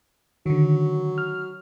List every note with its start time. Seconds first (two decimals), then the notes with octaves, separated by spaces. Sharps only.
0.46 D3 D#3 F#3
1.18 F6